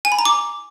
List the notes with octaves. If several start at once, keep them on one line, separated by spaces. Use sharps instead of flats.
G#5
B5
A#5
D6